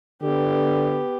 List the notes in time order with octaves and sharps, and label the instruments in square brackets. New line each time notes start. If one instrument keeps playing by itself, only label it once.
[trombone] D3 [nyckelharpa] B3 G4